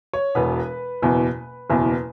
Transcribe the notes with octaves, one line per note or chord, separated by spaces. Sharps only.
C#5
E1 E2 B2 B3 B4
F#1 E2 B2
F#1 E2 B2